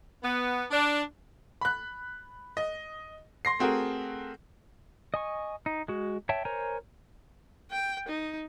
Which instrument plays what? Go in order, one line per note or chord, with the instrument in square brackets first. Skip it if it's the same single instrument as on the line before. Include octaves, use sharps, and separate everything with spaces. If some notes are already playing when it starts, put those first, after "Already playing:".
[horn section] B3
D4
[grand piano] B5 F#6
D#5
C6 A#6 C7
A3 C4 F#4 G#4 A#4
[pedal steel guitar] D#5 G#5 C#6
D#4
G#3 F#4
C#5 E5 G5 A5
A#4 C5 C#5 G#5 A#5
[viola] G5
D#4